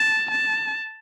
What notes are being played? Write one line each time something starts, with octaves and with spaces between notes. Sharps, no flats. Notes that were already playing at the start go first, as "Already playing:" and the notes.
Already playing: A5
A5